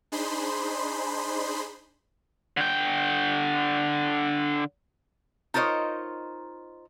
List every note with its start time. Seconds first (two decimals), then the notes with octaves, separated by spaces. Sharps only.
0.12 D4 D#4 G#4 C5 B5 C6
2.57 D3 G5
5.54 D#4 F4 A#4 C5 C#5 D#5